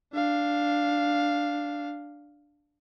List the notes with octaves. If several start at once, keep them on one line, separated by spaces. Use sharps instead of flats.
D4 F5